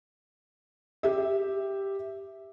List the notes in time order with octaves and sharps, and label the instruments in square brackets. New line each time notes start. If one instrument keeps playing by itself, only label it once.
[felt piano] G4 E5